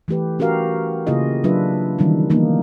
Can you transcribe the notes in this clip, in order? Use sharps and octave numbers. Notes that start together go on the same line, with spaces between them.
E3 A3 G4 B4
C#4 F#4 G4 A#4 F5
C#3 A#3 E4 F4 G#4 D#5
F#3 D4 F4 B4 E5
D#3 E3 G3 A#3 C#4 D#4
E3 G3 A#3 B3 D#4